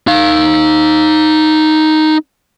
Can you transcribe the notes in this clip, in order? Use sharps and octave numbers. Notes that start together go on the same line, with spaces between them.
D#4 F5